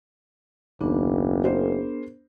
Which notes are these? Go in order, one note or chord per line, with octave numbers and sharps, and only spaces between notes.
F#1 D#2 B3 D4
G#4 A#4 C5